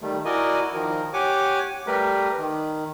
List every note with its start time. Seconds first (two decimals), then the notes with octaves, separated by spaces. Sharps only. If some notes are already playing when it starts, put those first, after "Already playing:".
0.01 D#3 G3 A3
0.25 E4 F#4 A#4 D5 D#5 G#5
0.73 D#3 F3 A#4
1.13 G4 C#5 F#5 G#5 D6
1.87 G3 A3 G4 A#4 B4
2.38 D#3